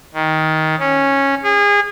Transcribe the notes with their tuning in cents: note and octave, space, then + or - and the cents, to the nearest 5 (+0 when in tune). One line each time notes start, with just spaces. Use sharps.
D#3 +15
C#4 -10
G#4 -30